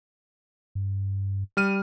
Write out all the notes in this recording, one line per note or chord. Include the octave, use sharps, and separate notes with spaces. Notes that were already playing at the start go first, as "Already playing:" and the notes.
G2
G3 F6 D#7